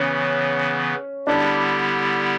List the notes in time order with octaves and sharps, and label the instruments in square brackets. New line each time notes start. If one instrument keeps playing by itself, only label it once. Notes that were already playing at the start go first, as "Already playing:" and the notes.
Already playing: [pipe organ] C#3 E3 B3 [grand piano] C#4
[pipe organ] D3 G3 B3 E4 G4 [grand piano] D4